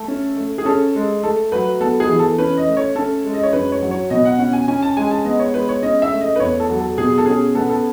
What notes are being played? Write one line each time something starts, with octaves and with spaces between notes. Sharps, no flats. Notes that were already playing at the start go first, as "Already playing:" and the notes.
Already playing: A3 A4
C#4
A3
G#4
C#4 A4
G#3
A3 A4
F#3 B4
B3 A4
G#4
E3
A4
C#4 B4
D#5
A3
C#5
C#4 A4
G#3
D#5
C#5
F#2 B4
C#5
F#3
C#5
B2 D#5
F#5
C#4 F#5
G#5
C#4 G#5
A5
G#3 G#5
A5
B3 D#5
C#5
G#3 B4
C#5
C#4 D#5
E5
A3
D#5
B4
E2 C#5
A4
F#3
A4
B2 G#4
A4
C#4 G#4
B3 A4
A4